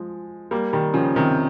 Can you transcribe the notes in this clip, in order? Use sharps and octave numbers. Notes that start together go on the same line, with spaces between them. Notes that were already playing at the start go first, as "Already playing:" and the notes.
Already playing: F3 G#3
G3 A#3
D#3 G3
C#3 F3
C3 D#3